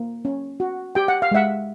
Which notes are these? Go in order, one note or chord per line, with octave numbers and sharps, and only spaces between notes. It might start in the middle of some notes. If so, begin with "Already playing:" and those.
Already playing: A#3
C#4
F#4
G4 G5
F#5
F5
G#3 E5 F#5